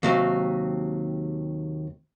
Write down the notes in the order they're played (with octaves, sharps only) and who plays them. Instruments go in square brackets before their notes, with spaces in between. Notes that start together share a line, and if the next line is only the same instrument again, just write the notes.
[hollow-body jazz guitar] D#2 C3 F#3